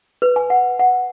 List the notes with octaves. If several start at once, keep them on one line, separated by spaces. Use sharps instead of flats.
B4
G#5
F#5
F#5